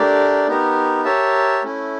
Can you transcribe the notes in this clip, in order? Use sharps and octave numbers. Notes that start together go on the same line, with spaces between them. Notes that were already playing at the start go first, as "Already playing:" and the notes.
Already playing: A3 D4 G4 A#4 D5
B3 D#4 G4 A#4
G4 A#4 C#5 E5 A5
A3 C#4 E4